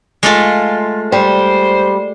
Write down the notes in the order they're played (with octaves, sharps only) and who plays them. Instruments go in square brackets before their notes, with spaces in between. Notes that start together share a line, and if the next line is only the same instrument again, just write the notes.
[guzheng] G#3 A3 F4
[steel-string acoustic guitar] G3 [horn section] C5